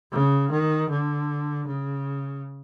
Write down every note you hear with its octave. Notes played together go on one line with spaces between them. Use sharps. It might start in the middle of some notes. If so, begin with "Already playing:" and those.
C#3
D#3
D3
C#3